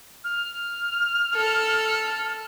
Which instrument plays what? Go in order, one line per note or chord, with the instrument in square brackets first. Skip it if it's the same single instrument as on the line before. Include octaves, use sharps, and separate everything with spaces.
[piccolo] F6
[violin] A4